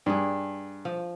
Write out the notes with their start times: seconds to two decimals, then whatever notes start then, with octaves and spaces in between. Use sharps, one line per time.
0.06 G2 D4 G#4
0.85 F3